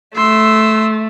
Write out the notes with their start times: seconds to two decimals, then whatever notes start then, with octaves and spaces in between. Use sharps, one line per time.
0.16 A3 C6 E6